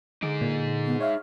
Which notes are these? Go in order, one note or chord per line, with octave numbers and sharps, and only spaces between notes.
D3 D#4 G#4 D6
A#2
B3
C#5 E5 F5